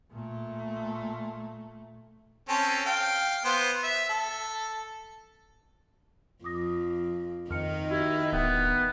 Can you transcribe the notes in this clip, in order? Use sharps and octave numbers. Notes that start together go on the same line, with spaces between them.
A#2 A3
C4 C#4 A4
F5 G5
B3 C5
E5
A4
F2 D6 D#6 A#6
F2 D#3 D#4 F6 C#7
E4 F#4 G4
D1 B3 E5 F#5 G5